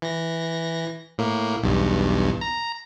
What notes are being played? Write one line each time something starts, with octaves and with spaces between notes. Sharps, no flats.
E3 A#6
A2 A#3
B1 E2 G2
A#5